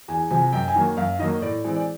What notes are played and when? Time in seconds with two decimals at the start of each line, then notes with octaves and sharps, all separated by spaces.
0.08 E2 G#5
0.31 C3 F3 G#5
0.53 F#2 G5
0.68 G#5
0.75 D#3 F#3 A#3
0.97 F#2 F5
1.19 D#3 F#3 A#3 D#5
1.42 A2 D5
1.64 E3 G#3 C4
1.76 D5